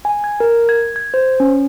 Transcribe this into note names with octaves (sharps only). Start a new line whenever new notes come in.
G#5
G#6
A#4
G#6
G#6
C5
C#4